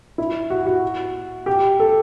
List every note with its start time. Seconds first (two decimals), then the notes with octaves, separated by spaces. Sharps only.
0.18 E4
0.50 F#4
0.66 F#4
1.46 G4
1.80 A4